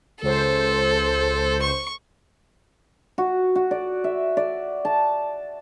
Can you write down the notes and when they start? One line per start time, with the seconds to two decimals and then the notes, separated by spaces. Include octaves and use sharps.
0.22 C#2 A4 C5
1.62 C#6
3.18 F#4
3.55 F#4
3.71 D5
4.04 E5
4.37 D5
4.85 A5